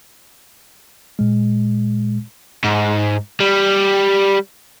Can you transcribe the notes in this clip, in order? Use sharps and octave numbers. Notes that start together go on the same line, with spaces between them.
A#2 G#3
G#2
G3